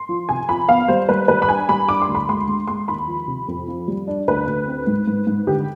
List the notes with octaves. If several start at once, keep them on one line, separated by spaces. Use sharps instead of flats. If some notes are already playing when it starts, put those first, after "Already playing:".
Already playing: C6
F3
C3 G#5
F3 B5
B3 F5
G3 C5
G3 B4
G3 B4
B5
D4 G#5
G3 B5
D4 D6
C6
D2
B5
G#3 C6
G#3
G#3 C6
D#2 B5
F3
C3
F2
F3
G3
D4
D2 B4
D2
C4
G#2
G#2
G#2
D3 G4